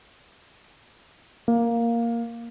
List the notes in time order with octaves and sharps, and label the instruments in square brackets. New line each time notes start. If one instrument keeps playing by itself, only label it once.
[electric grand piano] A#3